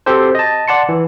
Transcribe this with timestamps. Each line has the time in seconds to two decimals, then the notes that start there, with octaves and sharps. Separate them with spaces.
0.06 C4 F#4 G4 A4 C5
0.35 D#5 A5
0.68 D5 F#5 A5 C6 C#7
0.89 E3